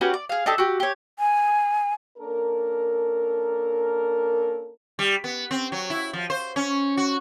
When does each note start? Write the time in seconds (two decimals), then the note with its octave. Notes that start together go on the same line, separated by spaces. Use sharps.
0.01 C#4 F#4 G4 B4
0.14 D5
0.29 G#4 F5
0.46 D4 D#4 G4 A4
0.58 F#4 G4
0.80 G4 C#5
1.19 G#5
2.19 A#3 C#4 D4 A4 A#4
4.99 G3
5.24 B3
5.51 C4
5.72 F#3
5.90 E4
6.13 F3
6.30 C5
6.56 C#4
6.97 F#4